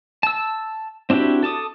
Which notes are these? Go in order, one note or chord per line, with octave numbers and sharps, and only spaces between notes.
A5 E6
C4 D4 E4 F#4 G4
A4 A5 D6 D#6